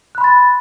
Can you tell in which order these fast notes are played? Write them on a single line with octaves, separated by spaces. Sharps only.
F#6 B5 C6 A6